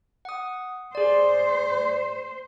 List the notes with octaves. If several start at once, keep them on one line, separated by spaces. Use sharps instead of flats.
F#5 D#6
G#4 C5 D5